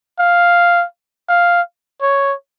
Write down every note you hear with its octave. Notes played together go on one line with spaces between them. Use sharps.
F5
F5
C#5